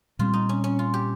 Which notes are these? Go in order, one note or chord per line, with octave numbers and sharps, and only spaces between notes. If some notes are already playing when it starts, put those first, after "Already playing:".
A#2 G3 C4 F4
D#4
C#4
C#4
F4
G4